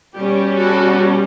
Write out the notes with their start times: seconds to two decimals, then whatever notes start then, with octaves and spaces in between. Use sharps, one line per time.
0.15 B2 G3 C#4 G4
0.59 F#4 A4